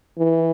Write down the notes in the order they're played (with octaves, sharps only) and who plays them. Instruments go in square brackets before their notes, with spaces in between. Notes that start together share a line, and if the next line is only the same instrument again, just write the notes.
[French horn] E3